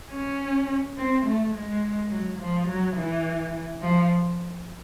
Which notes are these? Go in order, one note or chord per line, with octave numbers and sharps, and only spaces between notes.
C#4
C4
A3
G#3
F#3
F3
F#3
E3
F3